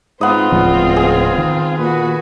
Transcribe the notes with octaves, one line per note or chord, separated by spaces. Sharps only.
G#2 B3 C4 F4 D#5
D1 C#2 A2 F3
G#4
D#3
A#2 F#4 B4